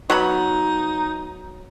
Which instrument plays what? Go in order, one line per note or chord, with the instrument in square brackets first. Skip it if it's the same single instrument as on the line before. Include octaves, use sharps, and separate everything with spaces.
[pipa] F#3 B3 B5 [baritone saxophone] D#4